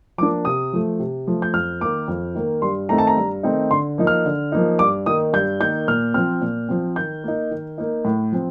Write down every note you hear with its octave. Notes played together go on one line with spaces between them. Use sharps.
F3 A#3 D4 D6
C3 D#6
F3 A3
C3
F3 A3
G6
F2 F6
D#3 A#3 D6
F2
D#3 A#3
G2 C6
D#3 A3 C4 D#4 A#5
A5
A#5
G2
D#3 A3 C4 D#4
D3 C6
F3 A#3 D#4
F6
D3
F3 A#3 D#4
G2 D6
D#3 A#3 D#4 D#6
G2 G6
D#3 A#3 D#4 G6
A#2 F6
F3 C4 F6
A#2
F3 C4
D#3 G6
A#3 D#4
D#3
A#3 D#4
A2
F3 C4